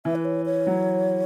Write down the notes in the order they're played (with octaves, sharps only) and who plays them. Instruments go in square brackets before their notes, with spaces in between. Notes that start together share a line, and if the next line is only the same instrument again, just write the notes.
[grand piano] E3 [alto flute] E5
[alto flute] B4
C#5
C#5
[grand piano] F#3